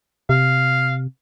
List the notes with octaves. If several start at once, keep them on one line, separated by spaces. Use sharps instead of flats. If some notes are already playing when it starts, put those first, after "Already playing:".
C3 F5